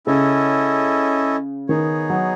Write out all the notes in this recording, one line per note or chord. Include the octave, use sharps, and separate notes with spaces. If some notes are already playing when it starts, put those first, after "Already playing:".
C#3 C#4 E4 A4 D#5
D#3 B3 D#4 G#4 C#5
F#3